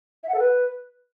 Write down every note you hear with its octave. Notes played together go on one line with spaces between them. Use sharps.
E5
F#5
A4
B4